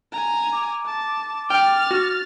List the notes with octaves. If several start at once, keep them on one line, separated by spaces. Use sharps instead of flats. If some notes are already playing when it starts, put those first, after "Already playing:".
G#5 A#5
D6
A5
G5 F6 A6
F#4